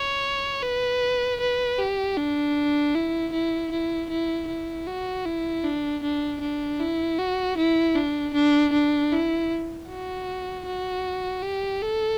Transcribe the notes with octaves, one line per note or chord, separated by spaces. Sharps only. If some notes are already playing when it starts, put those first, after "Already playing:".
Already playing: C#5
B4
B4
G4
D4
E4
E4
E4
E4
E4
F#4
E4
D4
D4
D4
E4
F#4
E4
D4
D4
D4
E4
F#4
F#4
G4
A4